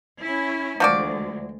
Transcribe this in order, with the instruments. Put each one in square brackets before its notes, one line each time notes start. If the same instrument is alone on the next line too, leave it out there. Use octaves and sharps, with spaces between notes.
[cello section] C#4 E4
[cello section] D2 E3 G#3 [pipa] F3 F#4 D5